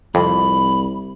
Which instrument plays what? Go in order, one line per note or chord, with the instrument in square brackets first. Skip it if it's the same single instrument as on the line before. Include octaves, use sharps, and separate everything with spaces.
[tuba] C2 [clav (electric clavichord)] F2 [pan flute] B5